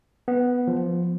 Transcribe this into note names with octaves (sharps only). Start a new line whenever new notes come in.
B3
F3